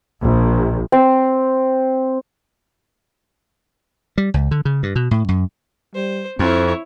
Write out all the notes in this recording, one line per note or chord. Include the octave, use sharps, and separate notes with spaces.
A#1
C4
G3
C#2
D3
C#3
G2
B2
A2
F#2
G3 C5
F2 C4 E4 C#5